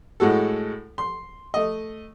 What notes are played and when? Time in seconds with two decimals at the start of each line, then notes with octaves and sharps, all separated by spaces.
0.20 A2 G#3 F#4 A4
0.98 C6
1.54 A3 D#5